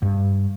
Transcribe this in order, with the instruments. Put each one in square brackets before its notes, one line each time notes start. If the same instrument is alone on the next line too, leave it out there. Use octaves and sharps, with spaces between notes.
[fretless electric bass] G2